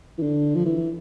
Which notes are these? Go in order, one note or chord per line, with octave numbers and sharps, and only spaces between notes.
E3
D3
F3
E3